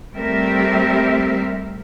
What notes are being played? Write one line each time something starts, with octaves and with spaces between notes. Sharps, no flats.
G3 A3 C4 G4 A#4 E5